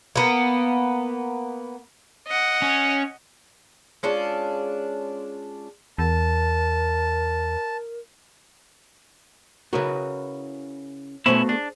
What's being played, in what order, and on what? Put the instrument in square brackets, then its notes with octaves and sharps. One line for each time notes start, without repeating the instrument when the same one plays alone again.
[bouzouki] A#3 B3
[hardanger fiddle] D#5 F#5
[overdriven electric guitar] C#4
[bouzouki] G#3 C#4 D4 F4
[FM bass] E2 [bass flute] A#4 [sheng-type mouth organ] A5
[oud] C#3 E4 A#4 [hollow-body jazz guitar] F#4 B4 C#5
[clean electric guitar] B2 C#4 E4 [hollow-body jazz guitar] A3 B3 [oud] F#4 C5
[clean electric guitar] D4 [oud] G#4